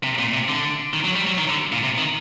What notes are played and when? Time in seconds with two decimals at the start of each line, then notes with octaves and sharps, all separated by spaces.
0.03 C3
0.18 A#2
0.33 C3
0.48 D3
0.94 D#3
1.04 F#3
1.16 G3
1.27 F#3
1.38 D#3
1.49 D3
1.72 A#2
1.83 C3
1.98 D#3